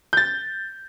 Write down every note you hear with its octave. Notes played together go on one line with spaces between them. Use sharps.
G6 A6